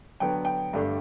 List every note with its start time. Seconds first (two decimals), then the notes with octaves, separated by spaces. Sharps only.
0.20 D3 F#3 B3 G5
0.45 G5
0.73 G2 D3 A3 D4